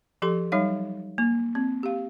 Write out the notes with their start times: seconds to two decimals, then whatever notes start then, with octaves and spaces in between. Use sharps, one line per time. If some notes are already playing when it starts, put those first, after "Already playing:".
0.22 F3 G4 A4 C6
0.52 F#3 G3 D#4 C#5 F5
1.18 A#3
1.55 C4
1.83 G4 F5